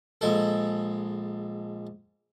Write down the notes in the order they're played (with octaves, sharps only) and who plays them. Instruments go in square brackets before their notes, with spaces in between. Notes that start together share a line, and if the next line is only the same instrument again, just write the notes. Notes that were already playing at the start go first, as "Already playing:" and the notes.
[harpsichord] A#1 G#3 A4